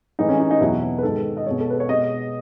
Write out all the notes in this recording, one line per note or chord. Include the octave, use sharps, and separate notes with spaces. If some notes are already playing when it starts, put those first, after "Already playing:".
A2 E3 G#3 D#4
C#4
D#4
D#4
E2 B2 F#3 E4
B4
G#2 D#3 G#3 A4
D#5
B2 G#3 C#5
A4
B4
C#5
B2 G#3 D#5